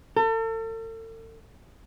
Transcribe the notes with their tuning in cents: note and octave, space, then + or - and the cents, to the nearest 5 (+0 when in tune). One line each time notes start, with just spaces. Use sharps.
A4 +40